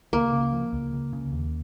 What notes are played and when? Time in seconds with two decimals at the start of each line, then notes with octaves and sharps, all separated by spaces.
0.13 C#2 A#3
0.33 C#3
0.52 F3
0.73 C#2
0.93 C#2
1.13 C#3
1.32 D#2